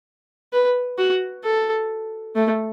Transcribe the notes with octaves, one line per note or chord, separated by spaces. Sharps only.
B4
F#4
A4
A3